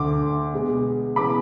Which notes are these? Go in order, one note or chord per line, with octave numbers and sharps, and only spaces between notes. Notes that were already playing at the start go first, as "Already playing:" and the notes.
Already playing: D2 D3 A3 D6
B2 G#3 B3
C#3 E3 B3 B5 D6